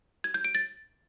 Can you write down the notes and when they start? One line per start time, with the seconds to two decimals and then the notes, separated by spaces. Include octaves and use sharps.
0.24 G#6
0.34 G6
0.45 D7
0.55 A6